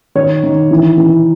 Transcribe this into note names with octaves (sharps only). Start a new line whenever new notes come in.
D#3 C#5
D#3
E3
E3